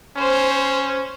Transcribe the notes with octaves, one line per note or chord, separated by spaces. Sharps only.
C#4 C5